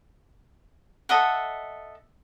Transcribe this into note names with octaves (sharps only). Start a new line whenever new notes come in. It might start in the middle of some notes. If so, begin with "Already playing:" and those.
A4 D#5 E5 F#5